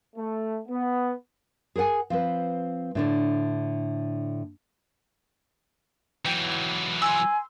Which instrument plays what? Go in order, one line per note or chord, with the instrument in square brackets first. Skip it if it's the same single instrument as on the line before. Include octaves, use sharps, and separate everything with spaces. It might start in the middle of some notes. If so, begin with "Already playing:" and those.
[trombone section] A3
B3
[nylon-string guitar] G#4 A#4 C5 F#5 G#5
F3 C4 B4
A2 D3 D4
[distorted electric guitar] E3 F#3 [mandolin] G5
[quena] G#5 [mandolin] C6 E6